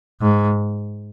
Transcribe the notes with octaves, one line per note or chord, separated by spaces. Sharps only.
G#2